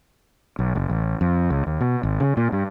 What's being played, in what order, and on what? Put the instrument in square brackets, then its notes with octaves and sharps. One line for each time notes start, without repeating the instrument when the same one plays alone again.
[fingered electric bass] B1
F#1
A1
F2
C#2
D#2
B2
G#1
C#3
A#2
G2